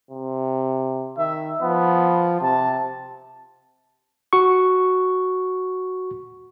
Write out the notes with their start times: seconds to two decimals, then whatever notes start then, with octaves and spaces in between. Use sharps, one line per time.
0.11 C3
1.18 D#3 E5
1.61 F3 B3
2.41 C3 A5
4.33 F#4 C#6